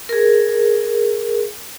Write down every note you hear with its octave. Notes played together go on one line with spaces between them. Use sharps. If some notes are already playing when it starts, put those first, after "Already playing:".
G#4 A#4